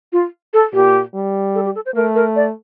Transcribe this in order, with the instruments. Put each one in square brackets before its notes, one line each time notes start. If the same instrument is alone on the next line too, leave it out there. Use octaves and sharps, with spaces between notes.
[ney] F4
A4
[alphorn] A#2 [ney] G4
[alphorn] G3
[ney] A4
G4
A4
C5
[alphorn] A3 [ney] A#4
[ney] A#4
D5